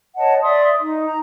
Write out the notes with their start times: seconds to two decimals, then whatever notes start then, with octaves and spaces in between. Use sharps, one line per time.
0.17 C#5 D#5 F#5 A5
0.43 D5 E5 C6 D#6
0.80 D#4
1.05 A#5